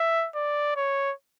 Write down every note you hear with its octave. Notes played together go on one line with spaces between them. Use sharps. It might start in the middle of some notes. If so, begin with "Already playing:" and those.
Already playing: E5
D5
C#5